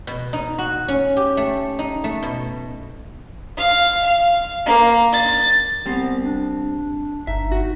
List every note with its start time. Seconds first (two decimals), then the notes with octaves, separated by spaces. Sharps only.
0.07 B2
0.33 D#4
0.58 F#4
0.88 C#4
1.17 G4
1.37 A3
1.79 D#4
2.04 A3
2.22 B2
3.57 F5
4.03 F5
4.66 A#3
5.13 A6
5.86 G3 B3 C4
6.24 D4
7.27 G1 D#4 E5
7.52 F#4